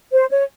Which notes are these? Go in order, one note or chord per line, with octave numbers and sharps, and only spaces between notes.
C5
C#5